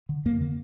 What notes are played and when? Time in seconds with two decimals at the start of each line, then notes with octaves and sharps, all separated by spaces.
0.09 D3
0.25 F2 A#3
0.41 D3